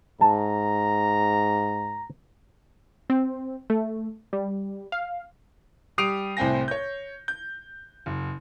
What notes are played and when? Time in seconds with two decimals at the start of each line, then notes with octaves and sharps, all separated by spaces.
0.21 G#2 A5 A#5
3.10 C4
3.70 A3
4.33 G3
4.92 F5
5.98 G3 G4 D#6 C7 D7 F7
6.37 C2 A2 C4 G5 G#5 A#6
6.68 C#5 G6
7.28 G6
8.06 F#1